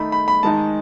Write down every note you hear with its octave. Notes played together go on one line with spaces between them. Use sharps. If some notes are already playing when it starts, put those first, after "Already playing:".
Already playing: D#3 A3 D#4 B5
B5
B5
G#2 D#3 G#3 D#4 A5